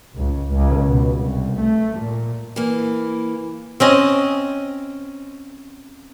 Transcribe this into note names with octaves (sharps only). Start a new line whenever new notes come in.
C#2
C#2
B2
C2
A3
A#2
E3 A#3
C4 C#4 D#5